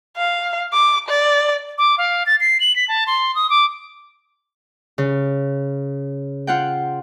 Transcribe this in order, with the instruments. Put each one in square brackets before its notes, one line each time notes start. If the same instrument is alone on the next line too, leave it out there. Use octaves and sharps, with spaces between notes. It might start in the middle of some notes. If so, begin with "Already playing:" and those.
[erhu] F5
D6
D5
[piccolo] D6
F5
A6
C7
F#7
B6
A5
C6
D#6
D6
[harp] C#3
F4 F#5 G5